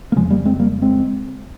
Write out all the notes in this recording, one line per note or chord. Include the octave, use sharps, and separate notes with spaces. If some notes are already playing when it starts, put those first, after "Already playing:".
A#3
F2 C#3 F3 G#3
G3 A#3
G#3 C4
G3 A#3
G#3 C4